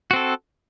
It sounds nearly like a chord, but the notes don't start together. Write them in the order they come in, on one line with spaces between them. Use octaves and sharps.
F#4 C4 A4